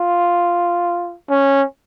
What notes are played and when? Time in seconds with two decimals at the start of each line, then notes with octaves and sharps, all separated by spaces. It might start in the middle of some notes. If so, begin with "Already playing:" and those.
Already playing: F4
1.30 C#4